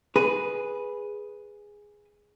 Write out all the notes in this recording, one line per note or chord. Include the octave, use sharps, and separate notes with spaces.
G#4 B4